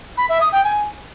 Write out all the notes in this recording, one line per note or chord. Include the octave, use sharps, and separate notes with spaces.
B5
E5
D#6
G5
G#5